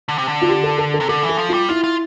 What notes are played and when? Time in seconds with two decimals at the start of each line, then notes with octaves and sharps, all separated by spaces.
0.09 D3
0.18 C3
0.28 D3
0.41 F4
0.48 G4
0.63 A4
0.78 A4
0.94 A4
1.00 C3
1.08 D3 A4
1.23 E3
1.29 A4
1.38 F3
1.49 G3 F4
1.69 E4 F4
1.84 F4